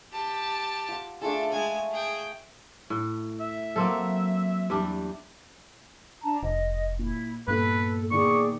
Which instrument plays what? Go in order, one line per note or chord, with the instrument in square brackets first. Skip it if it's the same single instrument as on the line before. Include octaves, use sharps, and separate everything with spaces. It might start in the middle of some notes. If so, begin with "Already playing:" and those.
[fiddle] G4 A5
[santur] F4 F#5
[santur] A3 F4 G#4 [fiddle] D4 A4
[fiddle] G#3 G#5 [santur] E5 F#5 A5
[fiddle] G#4 G5
[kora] A2
[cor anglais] E5
[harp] F#3 [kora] A#3 C4 A4
[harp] E2 [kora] G3 D4
[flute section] D4 A5 A#5
[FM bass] F1 [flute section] D#5
[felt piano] A#2 [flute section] E4
[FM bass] G2 [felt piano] A#2 B3 [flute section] A4 [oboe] B4
[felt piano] A#2 D#3 B3 [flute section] G#4 D5 D6 [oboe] C#6